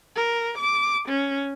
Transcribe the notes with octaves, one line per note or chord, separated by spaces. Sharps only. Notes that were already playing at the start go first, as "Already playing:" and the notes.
A#4
D6
C#4